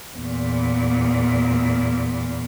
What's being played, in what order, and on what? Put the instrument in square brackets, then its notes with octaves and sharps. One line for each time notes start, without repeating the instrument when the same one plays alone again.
[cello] E2 A#2